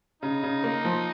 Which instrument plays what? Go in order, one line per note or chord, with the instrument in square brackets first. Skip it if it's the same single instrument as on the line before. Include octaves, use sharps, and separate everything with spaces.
[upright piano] C#3 [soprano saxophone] D#4
[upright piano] C#3
A#3
F3